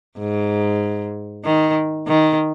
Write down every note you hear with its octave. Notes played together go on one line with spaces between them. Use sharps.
G#2
D#3
D#3